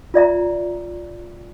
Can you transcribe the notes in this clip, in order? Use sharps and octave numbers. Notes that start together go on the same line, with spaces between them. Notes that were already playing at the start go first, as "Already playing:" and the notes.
F4 D5 E5 A#5